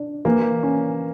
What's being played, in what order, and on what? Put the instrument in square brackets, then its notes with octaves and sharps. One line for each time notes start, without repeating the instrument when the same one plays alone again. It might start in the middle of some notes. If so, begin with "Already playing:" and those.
Already playing: [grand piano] D4
[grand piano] E3 [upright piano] A#3
[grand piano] C#4